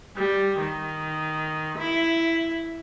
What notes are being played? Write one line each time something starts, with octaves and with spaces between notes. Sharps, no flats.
G3
D#3
E4